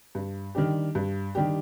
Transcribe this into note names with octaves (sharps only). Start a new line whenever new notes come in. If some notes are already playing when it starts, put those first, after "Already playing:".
G2
D#3 G3 D4 G4
G2
D#3 G3 D4 G4